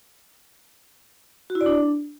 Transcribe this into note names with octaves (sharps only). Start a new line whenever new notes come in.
F#4
E4
D5
D4